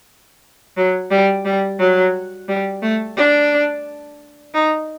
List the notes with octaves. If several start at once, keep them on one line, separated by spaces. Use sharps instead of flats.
F#3
G3
G3
F#3
G3
A3
D4
D#4